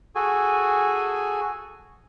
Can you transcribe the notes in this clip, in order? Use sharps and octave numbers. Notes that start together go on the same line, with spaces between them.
F#4 G#4 A4 G#5